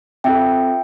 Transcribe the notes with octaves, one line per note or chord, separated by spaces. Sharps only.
C4 F4 A4 E5 G5